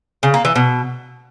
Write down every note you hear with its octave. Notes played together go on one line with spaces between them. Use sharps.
C#3
A#3
E3
B2